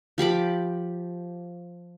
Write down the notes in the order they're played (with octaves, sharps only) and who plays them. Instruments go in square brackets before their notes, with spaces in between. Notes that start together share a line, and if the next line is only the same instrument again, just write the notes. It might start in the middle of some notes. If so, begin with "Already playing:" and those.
[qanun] F3 G4 B5 D6